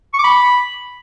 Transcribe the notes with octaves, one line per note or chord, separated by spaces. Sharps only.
C#6
D6
B5